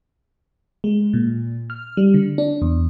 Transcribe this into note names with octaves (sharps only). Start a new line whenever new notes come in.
G#3
A#2
F6
G3
D3
D4
E2